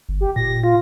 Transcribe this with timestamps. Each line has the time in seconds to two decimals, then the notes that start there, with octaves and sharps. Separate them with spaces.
0.09 G1
0.21 G4
0.36 A#2 A#6
0.64 F4